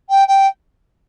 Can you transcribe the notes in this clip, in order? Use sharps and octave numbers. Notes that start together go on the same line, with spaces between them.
G5
G5